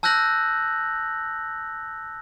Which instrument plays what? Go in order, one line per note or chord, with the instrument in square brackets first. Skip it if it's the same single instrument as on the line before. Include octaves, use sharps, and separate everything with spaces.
[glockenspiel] A5 E6 F#6 G6 A#6 F#7